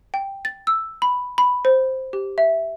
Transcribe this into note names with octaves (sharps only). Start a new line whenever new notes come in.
G5
A6
E6
B5
B5
C5
G4
E5